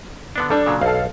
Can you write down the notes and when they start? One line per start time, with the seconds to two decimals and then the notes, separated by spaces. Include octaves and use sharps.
0.36 D3 B3 D4
0.50 G3 D4 A4
0.66 A#2 C#3 F#3
0.81 B1 A4 F5